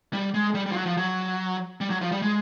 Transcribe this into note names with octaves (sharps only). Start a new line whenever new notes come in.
G3
G#3
G3
G3
F3
F#3
F3
F#3
G3
F#3
F3
G3
G#3